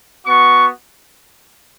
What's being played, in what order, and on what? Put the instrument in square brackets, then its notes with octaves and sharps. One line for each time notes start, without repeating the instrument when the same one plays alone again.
[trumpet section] B3 F#4 C#6